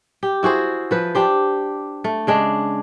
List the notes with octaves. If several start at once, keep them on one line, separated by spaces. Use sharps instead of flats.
G4
E4 F#4 G#4 C5
F3 B4
D4 G4 C5
A3
C#3 G#3 D4